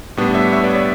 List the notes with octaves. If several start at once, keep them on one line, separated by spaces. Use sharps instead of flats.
A2 G3 B3 D4
C#5 E5
C#5 E5
B4 D5
C#5